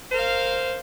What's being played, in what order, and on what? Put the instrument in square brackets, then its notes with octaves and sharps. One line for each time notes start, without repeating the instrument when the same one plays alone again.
[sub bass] G1 [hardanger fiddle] A#4 F5 [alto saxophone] C5